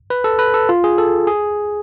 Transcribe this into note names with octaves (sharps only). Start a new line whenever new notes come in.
B4
A4
B4
A4
F4
G#4
A4
G#4